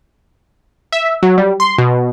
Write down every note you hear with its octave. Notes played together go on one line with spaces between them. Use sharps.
E5
F#3
G3
C6
B2